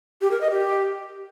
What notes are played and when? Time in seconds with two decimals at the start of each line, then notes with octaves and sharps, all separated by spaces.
0.21 G4
0.31 A#4
0.41 D#5
0.50 G4